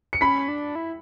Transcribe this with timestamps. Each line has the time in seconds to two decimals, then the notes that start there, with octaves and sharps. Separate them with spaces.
0.13 C#7
0.21 C#4 B5 B6
0.48 D4
0.75 E4